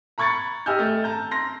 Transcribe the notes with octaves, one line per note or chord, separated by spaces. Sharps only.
A#5 B5 C#6 G#6 A6 C#7
G4 D#5 G#5 E6 F6 G6
A3
A5 A#5 G6
C6 A#6